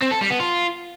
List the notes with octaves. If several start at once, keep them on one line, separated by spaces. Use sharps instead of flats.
C4
A4
G3
B3
F4